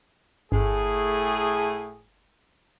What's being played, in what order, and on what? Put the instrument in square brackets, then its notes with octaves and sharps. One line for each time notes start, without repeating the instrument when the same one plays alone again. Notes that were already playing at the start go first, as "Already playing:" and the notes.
[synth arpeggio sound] G1 [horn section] A2 A3 G#4